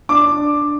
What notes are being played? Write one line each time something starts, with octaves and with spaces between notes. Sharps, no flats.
D4 D6
D4